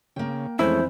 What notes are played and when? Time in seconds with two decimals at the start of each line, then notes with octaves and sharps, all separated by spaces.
0.16 C#3 A#3 G5
0.59 F2 E3 G#3 A3 C#4 E4 C5